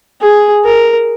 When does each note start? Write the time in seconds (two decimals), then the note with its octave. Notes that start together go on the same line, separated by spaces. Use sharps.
0.21 G#4
0.64 A#4